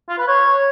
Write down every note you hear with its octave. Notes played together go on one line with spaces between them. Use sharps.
F4
B4
C#5